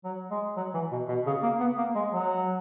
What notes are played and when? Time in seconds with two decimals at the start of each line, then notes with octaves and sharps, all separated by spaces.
0.05 F#3
0.31 G#3
0.57 F#3
0.74 E3
0.92 B2
1.08 B2
1.26 C#3
1.43 A#3
1.60 B3
1.78 A#3
1.95 G#3
2.13 F#3